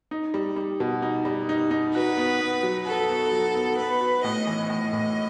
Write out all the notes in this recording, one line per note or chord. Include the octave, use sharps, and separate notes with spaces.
D#4
G3
G3
B2
D#4
G3
D#4
D#4
F#4 B4
B3
B3
F#3
F#4 A4
B3
F#3
B3
B3 B4
F#4
A2 D#5
E3
A2 D#5
A2